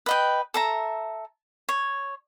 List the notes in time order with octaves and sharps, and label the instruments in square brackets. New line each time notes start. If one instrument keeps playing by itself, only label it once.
[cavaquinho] B4 D#5 G5
A4 E5 A#5
C#5